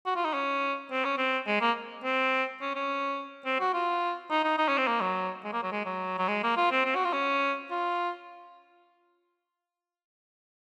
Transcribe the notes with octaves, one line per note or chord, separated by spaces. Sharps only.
F#4
F4
D#4
C#4
C4
C#4
C4
G#3
A#3
C4
C#4
C#4
C4
F#4
F4
D#4
D#4
D#4
C#4
C4
A#3
F#3
G#3
A#3
F#3
G#3
F#3
F#3
G#3
A#3
F4
C4
C4
F#4
F4
C#4
F4